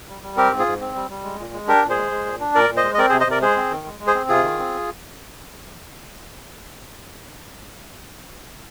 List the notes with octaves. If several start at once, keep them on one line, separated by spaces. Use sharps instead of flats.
G3
G3
C4 G4 A#4
G#2
F4 G#4
G#2
C4
G3
G3
G#3
A#2
G#3
D4 G4 A#4
A#2
G#4 C5
G#3
G#3
A#2
D4
A#2 A#4 D5
A#2
C5 D#5
G#3
D#5
C4 A#4 D5
G#4 C5
C3
C5 D#5
C3 A#4 D5
G#3 G#4 C5
C4
D#3
G#3
G#3
G#4 C5
C4
C3 F4 G#4
D#3
C4